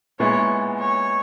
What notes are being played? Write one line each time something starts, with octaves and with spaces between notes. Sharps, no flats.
A#2 G#3 B3 E4 G#4 C#5
C#5